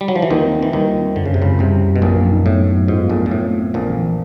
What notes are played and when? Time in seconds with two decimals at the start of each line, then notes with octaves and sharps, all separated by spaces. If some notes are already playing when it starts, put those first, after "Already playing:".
0.01 G3
0.08 F#3
0.16 F3
0.22 E3
0.30 D#2 D#3 F4
0.45 C4
0.59 E3 C4
0.73 D#2 D#3 G3
0.88 F4
1.02 C4
1.16 F#2 D3
1.26 C#3
1.31 F#2 C3
1.42 C#2 F#2 C#3
1.59 C2 C3 G3
1.74 F#2
1.88 F#2
1.96 B2
2.02 A#1 A#2 F#3
2.16 B3
2.31 D#4
2.46 A2 B3
2.60 F#3
2.75 B3
2.88 G#2 F4
3.03 F4
3.09 A#1 A#2
3.17 A3
3.26 A#2
3.31 A2 A3
3.46 C4
3.60 C4
3.74 A#1 A#2 C4
3.90 E3
4.03 E3